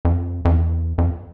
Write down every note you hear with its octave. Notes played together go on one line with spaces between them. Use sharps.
F2
F2
E2
F2